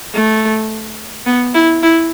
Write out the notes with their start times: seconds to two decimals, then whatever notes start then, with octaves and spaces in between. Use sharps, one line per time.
0.14 A3
1.26 B3
1.55 E4
1.83 E4